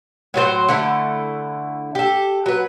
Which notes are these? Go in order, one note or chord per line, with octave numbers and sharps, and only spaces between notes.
A2 F#3 F#4 C5
D3 A3 E4
G4 A4
F#3 B4